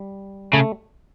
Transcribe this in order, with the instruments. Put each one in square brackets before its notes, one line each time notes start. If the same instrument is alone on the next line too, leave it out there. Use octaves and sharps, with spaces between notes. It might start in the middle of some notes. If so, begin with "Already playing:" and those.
Already playing: [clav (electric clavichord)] G3
[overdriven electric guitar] C#3 [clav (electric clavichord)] A3